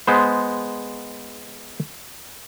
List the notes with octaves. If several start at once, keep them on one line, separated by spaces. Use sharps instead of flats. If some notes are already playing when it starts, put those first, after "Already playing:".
G#3 B3 C5